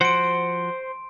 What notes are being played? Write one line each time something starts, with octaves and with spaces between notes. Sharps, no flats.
F3 F#4 C5 F#5 C6 D7